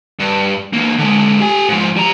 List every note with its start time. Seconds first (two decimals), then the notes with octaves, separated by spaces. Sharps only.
0.19 G2
0.73 E3 A#3
0.98 D3 G#3
1.40 G4 G#5
1.69 G#2 F3
1.96 G3 A#5